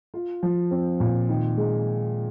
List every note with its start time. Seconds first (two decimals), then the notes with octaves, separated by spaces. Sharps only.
0.14 F4
0.43 F3
0.71 C4
1.00 A#2
1.29 D#3
1.57 G#3